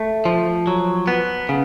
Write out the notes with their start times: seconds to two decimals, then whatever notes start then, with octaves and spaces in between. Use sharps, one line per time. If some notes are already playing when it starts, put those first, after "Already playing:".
Already playing: A3
0.25 F3
0.67 F#3
1.07 B3
1.49 C#3